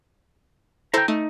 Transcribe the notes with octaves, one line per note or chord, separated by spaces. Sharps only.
E4 A4 C5 G5 A#5
A3 D#4